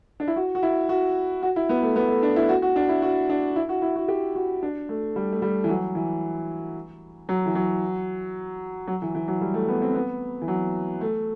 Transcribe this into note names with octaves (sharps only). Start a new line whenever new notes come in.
D4
E4
F#4
F#4
E4
F#4
F#4
E4
B3
A3
B3
A3
D4
E4
F#4
F#4
D4
E4
F#4
D4
E4
F#4
E4
F#4
G4
F#4
D4
A3
G3
A3
G3
E3
F#3
E3
F#3
E3
F#3
F#3
E3
E3
F#3
G3
A3
B3
C4
B3
E3
F#3
A3